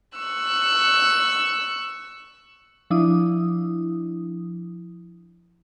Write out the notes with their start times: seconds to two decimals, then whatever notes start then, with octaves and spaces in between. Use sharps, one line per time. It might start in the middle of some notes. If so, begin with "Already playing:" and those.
0.18 C#6 E6 F#6
2.90 F3 D4 E4 D#6